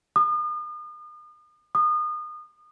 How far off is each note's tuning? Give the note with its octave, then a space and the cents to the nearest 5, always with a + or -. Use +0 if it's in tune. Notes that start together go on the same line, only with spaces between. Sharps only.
D#6 -40
D#6 -30